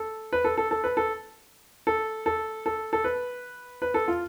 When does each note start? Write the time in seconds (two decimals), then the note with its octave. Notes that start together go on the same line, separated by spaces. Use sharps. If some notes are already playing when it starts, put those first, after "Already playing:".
Already playing: A4
0.33 B4
0.44 A4
0.57 A4
0.71 A4
0.84 B4
0.97 A4
1.87 A4
2.26 A4
2.66 A4
2.93 A4
3.04 B4
3.82 B4
3.94 A4
4.08 F4